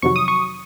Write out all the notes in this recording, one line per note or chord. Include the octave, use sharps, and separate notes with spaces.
F2 C3 D#3 F#3 C#6
D#6
C#6